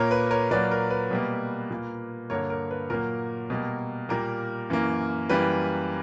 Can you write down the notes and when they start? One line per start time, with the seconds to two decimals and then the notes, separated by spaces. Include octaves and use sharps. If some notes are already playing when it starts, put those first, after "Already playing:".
Already playing: A#2 A#3 A#4 C#5
0.11 B4
0.31 A#4 C#5
0.51 A#2 F#3 A#3 B4 D5
0.71 A#4
0.90 B4
1.11 B2 G3 A#3
1.71 A#2 A#3
2.30 G2 D3 A#3 A#4 C#5
2.50 A#4
2.71 B4
2.90 A#2 F#3 A#3 A#4
3.50 B2 G3 A#3
4.09 A#2 G3 A#3 A#4
4.70 F#2 E3 A#3
5.29 F#2 E3 G3 A#3 B4